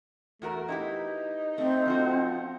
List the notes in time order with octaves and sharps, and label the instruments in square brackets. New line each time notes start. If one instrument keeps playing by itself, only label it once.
[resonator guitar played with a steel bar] E2 F#4 A#4 [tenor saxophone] A3
[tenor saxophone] D#4 [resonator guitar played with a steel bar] E4 G4 B4
[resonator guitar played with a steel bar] A3 [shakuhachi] C4
[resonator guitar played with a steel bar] F3 F4 F#4